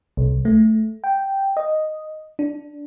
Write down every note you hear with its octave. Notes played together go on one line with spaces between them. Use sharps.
C2
A3
G5
D#5
D4